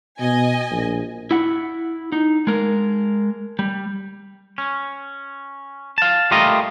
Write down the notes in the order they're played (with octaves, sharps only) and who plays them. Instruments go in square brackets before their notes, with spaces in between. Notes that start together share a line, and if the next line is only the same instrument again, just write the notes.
[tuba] B2 [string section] D#5 G#5
[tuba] A#1
[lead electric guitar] E4 F#5
D#4
G#3 A#4
G3
[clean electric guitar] C#4
F5 A5
G3 A3 F4 G4 A#4 D#5